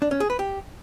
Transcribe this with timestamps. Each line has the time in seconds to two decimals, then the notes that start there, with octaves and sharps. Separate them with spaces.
0.02 D4
0.11 C#4
0.20 G#4
0.30 B4
0.39 G4